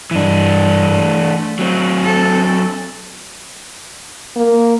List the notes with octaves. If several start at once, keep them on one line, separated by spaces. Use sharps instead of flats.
G2 E3 D4
A3
F#3 C4
A4
A#3